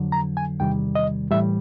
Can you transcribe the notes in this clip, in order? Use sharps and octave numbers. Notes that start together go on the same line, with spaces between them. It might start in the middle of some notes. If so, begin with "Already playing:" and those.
Already playing: F2 D3 F#3
A#5
G#5
E2 C3 D#3 G3 G5
D#5
A2 E3 G3 E5